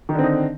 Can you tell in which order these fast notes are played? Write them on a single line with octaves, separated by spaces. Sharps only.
D#3 D3 C4 D#4